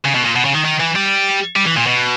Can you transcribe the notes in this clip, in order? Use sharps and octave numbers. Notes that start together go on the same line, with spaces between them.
C#3
B2
A#2
B2
C#3
D#3
D#3
E3
G3
G3
E3
A#2
B2